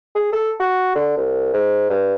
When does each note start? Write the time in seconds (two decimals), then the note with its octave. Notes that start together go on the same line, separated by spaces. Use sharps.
0.15 G#4
0.33 A4
0.60 F#4
0.95 D3
1.17 C2
1.54 G#2
1.90 G2